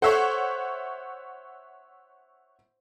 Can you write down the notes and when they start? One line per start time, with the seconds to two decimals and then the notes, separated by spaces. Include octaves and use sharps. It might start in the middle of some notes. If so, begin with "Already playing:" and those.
0.02 A4 C5 C#5 E5 F#5